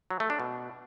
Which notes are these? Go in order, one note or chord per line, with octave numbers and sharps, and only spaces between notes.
F#3
A3
D4
B2